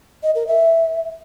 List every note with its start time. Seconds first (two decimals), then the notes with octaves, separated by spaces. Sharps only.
0.23 D#5
0.35 A#4
0.47 E5